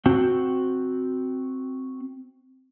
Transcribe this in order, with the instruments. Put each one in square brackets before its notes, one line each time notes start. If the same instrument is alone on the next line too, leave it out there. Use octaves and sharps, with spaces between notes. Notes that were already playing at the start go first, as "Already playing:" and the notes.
[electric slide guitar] C4 F#4 G5